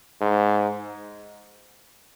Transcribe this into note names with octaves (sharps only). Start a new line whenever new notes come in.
G#2